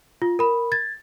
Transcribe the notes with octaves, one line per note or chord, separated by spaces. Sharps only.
F4
A#4 B5
G#6 A6